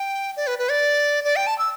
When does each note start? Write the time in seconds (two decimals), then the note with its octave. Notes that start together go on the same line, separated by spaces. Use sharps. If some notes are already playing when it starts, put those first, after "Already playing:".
Already playing: G5
0.36 D5
0.47 B4
0.59 B4
0.70 D5
1.24 D5
1.36 G5
1.47 A5
1.58 E6